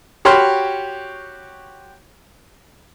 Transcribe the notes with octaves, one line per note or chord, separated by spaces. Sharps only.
F#4 G4 C#5 B5 C6 F6